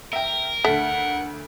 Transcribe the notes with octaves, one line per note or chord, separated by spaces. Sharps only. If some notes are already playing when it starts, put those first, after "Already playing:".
A#4 E5 G5
D2 A3 F#5 B6